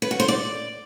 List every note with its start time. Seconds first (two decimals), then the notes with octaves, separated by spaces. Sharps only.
0.02 B4
0.11 F#4
0.20 C5
0.28 D5